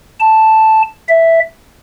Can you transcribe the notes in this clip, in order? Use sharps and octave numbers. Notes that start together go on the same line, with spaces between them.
A5
E5